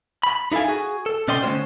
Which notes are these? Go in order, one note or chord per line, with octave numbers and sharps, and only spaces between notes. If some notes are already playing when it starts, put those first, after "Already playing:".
B5
D#4 E4 A4 F5 G#5
F#4 G#4
A4
B2 C#4 D5 D#5 G5 C6
D3 A3 C#4 F4 C5